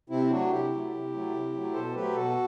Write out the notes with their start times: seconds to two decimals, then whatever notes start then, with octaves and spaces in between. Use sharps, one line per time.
0.10 C3 C4 E4
0.30 F#3 A3 D4 F#4
0.50 C3 E4 G4
0.71 F#3 A3
0.92 C3
1.12 F#3 A3
1.33 C3
1.53 F#3 A3
1.73 B2 A4 C5
1.94 F#3 A3 G4 B4
2.14 B2 F#4 A4